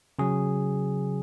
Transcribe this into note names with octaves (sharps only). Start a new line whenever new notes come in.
C#3 F#3 G#4